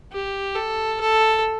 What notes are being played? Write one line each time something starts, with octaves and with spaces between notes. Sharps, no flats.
G4
A4
A4